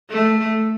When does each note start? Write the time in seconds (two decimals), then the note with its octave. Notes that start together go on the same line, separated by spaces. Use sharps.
0.10 A3